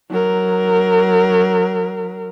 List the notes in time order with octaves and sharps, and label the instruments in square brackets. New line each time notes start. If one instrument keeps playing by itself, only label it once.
[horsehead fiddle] F#3 A#4